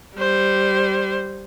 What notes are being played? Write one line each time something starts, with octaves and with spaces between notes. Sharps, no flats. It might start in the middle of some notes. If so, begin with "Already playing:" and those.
G3 C5